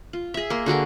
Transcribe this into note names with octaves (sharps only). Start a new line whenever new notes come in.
F4
G#4 E5
A#3 C6
D3 F#4 G#4 A#4